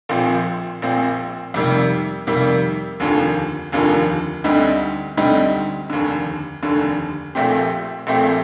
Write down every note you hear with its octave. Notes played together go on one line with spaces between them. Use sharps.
A#1 A#2 F3 C4
A#1 A#2 F3 C4
F2 C3 D#3 G3 A#3
F2 C3 D#3 G3 A#3
F1 D#2 D3 F3 A#3
F1 D#2 D3 F3 A#3
D2 D3 G3 C4 D#4
D2 D3 G3 C4 D#4
F1 D#2 D3
F1 D#2 D3
A#1 A#2 A3 C4 G4
A#1 A#2 A3 C4 G4